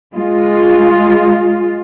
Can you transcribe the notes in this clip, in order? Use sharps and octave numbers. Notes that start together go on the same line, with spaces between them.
G#3 F4